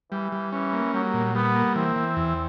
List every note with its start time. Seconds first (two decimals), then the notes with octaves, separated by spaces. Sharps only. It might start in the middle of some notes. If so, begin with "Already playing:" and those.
0.12 E3 G3
0.32 G3
0.53 E3 C#4
0.73 A#3
0.94 F#3 G3
1.14 A#2
1.35 G3 B3
1.55 A#3
1.76 E3 C4
1.96 E3
2.17 E2